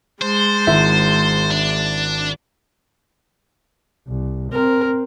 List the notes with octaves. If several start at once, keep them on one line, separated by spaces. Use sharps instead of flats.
G#3 C5 A5
G#1 E4 E5
D4
C2
C4 A#4